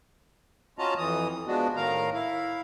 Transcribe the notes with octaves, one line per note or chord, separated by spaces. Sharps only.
C#4 F4 F#4 D#5 A5 A#5
F2 E3 D#6
F3 G#3 B3 D4 F#4
A2 D#3 A#4 F5 A#5
E4 F5